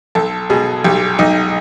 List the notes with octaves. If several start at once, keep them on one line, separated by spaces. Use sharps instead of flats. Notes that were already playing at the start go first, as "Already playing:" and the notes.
B1 A4
B2 G#4
B1 G4
B1 D#4